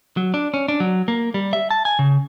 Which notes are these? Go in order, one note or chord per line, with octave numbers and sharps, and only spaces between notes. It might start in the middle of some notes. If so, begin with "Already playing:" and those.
F#3
D4
C#4
D4
F#3
A#3
G3
E5
A5
G#5
C#3